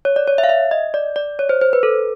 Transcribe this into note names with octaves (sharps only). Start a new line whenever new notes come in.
C#5
D5
C#5
E5
F5
E5
D#5
D5
D5
C#5
C5
C5
B4
A4